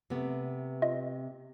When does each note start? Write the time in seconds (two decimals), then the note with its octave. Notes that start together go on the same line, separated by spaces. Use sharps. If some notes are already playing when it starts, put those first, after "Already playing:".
0.10 C3 A3 B3
0.82 F4 D#5 E5